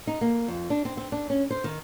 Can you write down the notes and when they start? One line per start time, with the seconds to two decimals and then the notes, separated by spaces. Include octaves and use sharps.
0.07 D#4
0.21 A#3
0.48 F2
0.70 D4
0.85 C4
0.97 C4
1.12 D4
1.30 C#4
1.51 C5
1.64 D#3